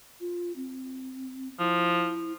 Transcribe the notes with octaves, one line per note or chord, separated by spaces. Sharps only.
F4
C4
F3 E4